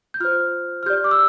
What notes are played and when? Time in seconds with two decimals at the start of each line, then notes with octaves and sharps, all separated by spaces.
0.14 G6
0.20 F4 C5 F6
0.83 F6
0.86 G4 D5 G6
1.04 D6
1.11 E6